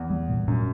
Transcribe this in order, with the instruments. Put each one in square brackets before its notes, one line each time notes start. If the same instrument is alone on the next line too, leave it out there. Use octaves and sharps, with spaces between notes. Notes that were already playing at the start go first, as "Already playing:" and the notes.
Already playing: [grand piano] E2
[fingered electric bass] G3
A#2
[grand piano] F#2 [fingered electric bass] A#2